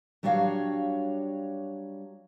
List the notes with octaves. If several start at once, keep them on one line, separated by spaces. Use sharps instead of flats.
F#3 G3 D4 F#4 C#5 F5